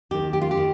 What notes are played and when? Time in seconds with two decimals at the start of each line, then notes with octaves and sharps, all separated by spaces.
0.11 D#2 D#3 G4
0.33 G4
0.41 F4
0.51 G4
0.57 D#3